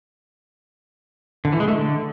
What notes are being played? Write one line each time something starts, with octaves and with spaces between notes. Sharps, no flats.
D3
E3
G#3
A3
D3